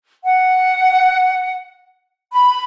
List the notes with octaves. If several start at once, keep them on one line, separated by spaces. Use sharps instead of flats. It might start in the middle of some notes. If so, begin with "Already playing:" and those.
F#5
B5